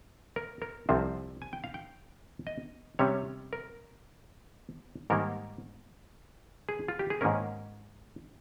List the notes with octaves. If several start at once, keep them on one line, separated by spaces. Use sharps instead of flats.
A#4
A#4
C2 C3 F3 C4 C5
G#5
G5
F5
G5
D#5
C3 G3 C#4 C#5
A#4
G#2 D#3 G3 A#3 A#4
G#4
F4
G4
G#4
G#2 D#3 A#3 C#4 A#4